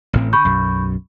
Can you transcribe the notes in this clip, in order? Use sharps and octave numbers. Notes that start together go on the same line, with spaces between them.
A1 A2 C4
D3 B5 C#6 G6
B1 F#2